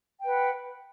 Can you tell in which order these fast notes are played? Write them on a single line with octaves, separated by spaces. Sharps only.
G5 B4 F#5